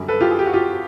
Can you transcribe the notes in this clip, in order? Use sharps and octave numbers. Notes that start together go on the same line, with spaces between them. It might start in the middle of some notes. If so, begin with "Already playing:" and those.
Already playing: F#2 D3 G3
A4 B4
F4 G4
G#4
G4
F#4
F4 G4